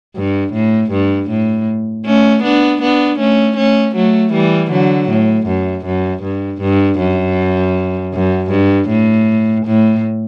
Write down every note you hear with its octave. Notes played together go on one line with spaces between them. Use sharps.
G2
A2
G2
A2
A3 C#4
B3 D4
B3 D4
A3 C#4
A3 C#4
F#3 A3
E3 G3
D3 F#3
A2
F#2
F#2
G2
G2
F#2
F#2
G2
A2
A2